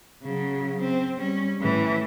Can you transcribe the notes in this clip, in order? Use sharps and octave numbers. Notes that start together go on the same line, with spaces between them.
C#3 F#3
C4
G3 C#4
A2 E3